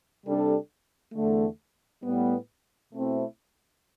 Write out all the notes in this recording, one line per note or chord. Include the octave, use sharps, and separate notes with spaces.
C3 G3 D4 A4
E2 D3 A3
A2 G3 B3
B2 A3 C4 E4